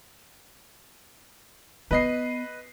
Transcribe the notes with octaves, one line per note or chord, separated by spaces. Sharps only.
B3 B4 D#5 C7